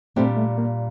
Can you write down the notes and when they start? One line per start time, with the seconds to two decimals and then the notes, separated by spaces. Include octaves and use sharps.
0.16 A#2 G3 A3 C4 D4
0.37 A3
0.58 A#3